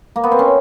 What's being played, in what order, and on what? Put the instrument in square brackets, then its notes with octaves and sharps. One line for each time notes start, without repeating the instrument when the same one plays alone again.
[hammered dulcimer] A#3
B3
C4
C#4